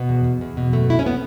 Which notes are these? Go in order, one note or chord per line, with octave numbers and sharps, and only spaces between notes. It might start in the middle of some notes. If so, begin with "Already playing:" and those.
Already playing: B2 B3
E2
E2
E2
B2
F#2 A3
F#2 E4
C#4
B3